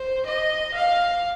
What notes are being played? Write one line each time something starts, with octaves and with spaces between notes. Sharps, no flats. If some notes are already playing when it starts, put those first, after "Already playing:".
Already playing: C5
D#5
F5